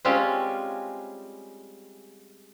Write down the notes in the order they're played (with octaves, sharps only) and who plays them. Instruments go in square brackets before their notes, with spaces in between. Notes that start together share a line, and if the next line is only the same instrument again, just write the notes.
[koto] G3 G#3 C4 C#4 F4 G4